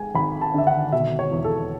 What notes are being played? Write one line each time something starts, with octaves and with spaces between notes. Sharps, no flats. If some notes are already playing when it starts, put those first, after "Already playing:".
Already playing: G#3 G#5
G#1 B5
A5
D3 E5
F#5
B2 E5
C#5
E2
A4